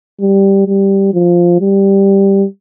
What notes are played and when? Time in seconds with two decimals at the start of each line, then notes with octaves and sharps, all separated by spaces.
0.21 G3
0.67 G3
1.14 F3
1.61 G3